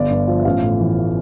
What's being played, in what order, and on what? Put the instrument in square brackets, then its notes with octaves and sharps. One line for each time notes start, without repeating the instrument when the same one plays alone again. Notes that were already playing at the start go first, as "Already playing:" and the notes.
Already playing: [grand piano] G1 D5
G2
F3
E5
A1 F5
A2
E3